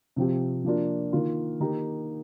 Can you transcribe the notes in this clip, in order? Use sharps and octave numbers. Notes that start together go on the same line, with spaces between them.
C3 F3 C4 G4
F3 A#3 D4 F4
D#3 A#3 F4
D#3 A#3 D#4 G4